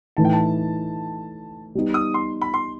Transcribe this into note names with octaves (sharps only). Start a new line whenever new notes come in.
A2 E3 A3 D#4 A5
G5
A5
G3 B3 D#4
D#6
C6
B5
C6